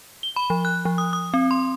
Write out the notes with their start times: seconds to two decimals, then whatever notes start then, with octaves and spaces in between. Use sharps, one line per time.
0.23 G7
0.36 B5
0.50 F3
0.65 F#6
0.85 F3
0.98 D#6
1.13 D#6
1.34 C4
1.51 C6